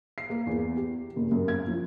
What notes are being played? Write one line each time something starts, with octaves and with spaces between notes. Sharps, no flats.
C7
A#3
E2
G4
F#1
F#2
G#6
F3